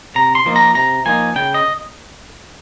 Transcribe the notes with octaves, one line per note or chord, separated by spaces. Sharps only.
C3 A#5
C6
F3 A#3 D#4
A#5
C3 A#5
F3 A#3 D#4 G#5
C#3 G5
D#5